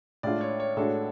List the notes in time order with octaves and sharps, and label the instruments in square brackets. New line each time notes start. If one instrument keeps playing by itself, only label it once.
[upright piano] A2 G#3 D4 F4 [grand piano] D5
[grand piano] C#5
C#5
[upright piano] A2 G#3 D4 F#4 [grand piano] A4